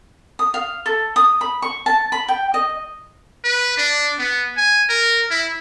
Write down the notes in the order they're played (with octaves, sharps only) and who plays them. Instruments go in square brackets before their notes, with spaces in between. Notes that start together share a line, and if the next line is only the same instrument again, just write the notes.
[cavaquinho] D#6
F5
A4
D#6
B5
C#6
A5
B5
G5
D#5
[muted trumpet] B4
D4
B3
G#5
A#4
E4